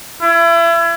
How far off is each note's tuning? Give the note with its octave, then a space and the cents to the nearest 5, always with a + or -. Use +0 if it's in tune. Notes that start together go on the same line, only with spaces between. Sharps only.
E4 +35